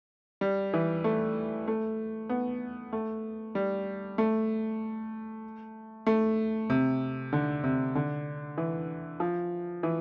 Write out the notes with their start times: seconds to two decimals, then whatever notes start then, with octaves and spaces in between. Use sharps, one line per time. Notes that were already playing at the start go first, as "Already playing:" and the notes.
0.41 G3
0.73 E3
1.04 A3
1.67 A3
2.29 B3
2.93 A3
3.55 G3
4.18 A3
6.06 A3
6.70 C3
7.33 D3
7.64 C3
7.95 D3
8.58 E3
9.20 F3
9.83 E3